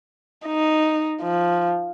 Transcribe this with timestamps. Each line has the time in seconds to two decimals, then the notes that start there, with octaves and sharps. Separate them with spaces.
0.46 D#4
1.22 F3